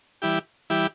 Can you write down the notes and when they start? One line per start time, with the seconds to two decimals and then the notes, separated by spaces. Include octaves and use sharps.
0.22 E3 G3 E4 G4
0.70 E3 G3 E4 G4